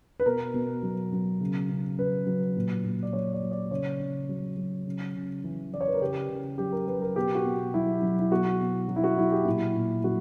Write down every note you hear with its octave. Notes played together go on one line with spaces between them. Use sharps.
B4
B2 A#4
B2
F#3
F#3
C#3
C#3
F#3 B4
F#3
A#2
A#2
D5
F#3 C#5
D5
F#3
D5
C#3 C#5
C#3
F#3
F#3
C#3
C#3
E3
E3 D5
C#5
B4
A#4
C#3 G4
C#3
F#3 G4
A#4
F#3 B4
A#4
B2 G4
F#4
B2
F#3 E4
F#3
E4
B2 F#4
B2
F#3
E4
F#4
F#3 E4
G4
A#2 E4
A#2
F#3 F#4